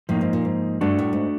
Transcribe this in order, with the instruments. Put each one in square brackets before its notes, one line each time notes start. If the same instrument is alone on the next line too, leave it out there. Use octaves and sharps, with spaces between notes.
[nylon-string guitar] A2 [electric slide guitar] F3 A#3 D#4
[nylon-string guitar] G#2
A#2
G#2
[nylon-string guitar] G2 [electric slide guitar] A3 D4 F#4
[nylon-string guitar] A2
G#2